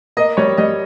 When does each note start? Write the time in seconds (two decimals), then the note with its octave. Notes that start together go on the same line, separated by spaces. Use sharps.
0.17 A#3 D#5
0.37 G3 C#5
0.57 G3 D#5